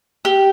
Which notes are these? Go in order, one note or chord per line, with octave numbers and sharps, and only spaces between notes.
G4